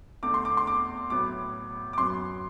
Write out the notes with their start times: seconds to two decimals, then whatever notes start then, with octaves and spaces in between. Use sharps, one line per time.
0.23 E2 D3 A3 D6
0.34 C6
0.45 D6
0.57 C6
0.67 D6
1.10 A2 F#3 B3 D6
1.93 D6
1.98 F#2 F#3 B3 C6